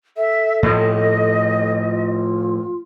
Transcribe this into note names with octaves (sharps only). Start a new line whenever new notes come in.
A4 E5
A2 F3 D#5
F4